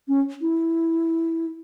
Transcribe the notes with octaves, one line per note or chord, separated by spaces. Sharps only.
C#4
E4